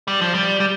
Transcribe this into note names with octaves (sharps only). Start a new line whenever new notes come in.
G3
F3
G3
G3